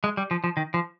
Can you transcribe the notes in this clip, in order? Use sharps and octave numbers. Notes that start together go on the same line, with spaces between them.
G#3
G3
F3
F3
D#3
F3